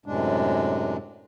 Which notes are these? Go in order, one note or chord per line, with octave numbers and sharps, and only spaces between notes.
F#2 A2 C3 G#3 D4